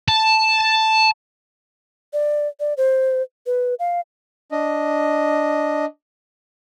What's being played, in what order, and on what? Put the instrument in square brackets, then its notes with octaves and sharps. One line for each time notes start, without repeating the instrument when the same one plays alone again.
[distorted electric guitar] A5
[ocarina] D5
D5
C5
B4
F5
[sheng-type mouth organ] D4 D#5